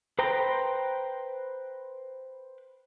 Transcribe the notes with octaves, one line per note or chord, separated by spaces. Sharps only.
B4 C5 G5 A#5 C6